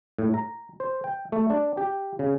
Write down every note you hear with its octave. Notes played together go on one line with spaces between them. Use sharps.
A2
A#5
C5
G5
A3
D4
G4
C#3